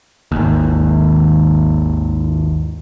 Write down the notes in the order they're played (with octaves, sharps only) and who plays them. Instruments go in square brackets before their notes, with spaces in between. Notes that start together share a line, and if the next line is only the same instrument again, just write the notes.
[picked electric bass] G#1 D#2